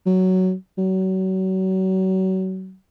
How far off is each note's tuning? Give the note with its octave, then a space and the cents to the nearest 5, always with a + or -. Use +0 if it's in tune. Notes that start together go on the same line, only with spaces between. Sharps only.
F#3 +10
F#3 +30